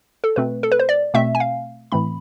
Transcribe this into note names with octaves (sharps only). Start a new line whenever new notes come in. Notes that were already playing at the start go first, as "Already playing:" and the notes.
A4
B2 A3 C4 B4
A4
B4
C5
D5
B2 A3 C4 E5
G#5
F5
A2 E3 A3 C4 B5